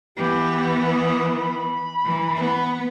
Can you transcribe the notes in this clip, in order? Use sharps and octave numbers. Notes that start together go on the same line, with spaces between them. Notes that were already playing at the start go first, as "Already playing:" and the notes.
E3 B3 G4
D#6
B5
E3
B3